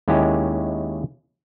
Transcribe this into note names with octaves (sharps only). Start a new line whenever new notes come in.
D#2 G#3 C#4 E4 G4